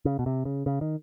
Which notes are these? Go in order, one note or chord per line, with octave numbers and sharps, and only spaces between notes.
C#3
B2
C3
C#3
C#3
D#3